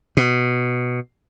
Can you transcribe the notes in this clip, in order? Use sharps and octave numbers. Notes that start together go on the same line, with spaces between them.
B2